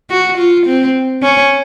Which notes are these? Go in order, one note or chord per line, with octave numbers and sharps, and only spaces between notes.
F#4
F4
C4
C#4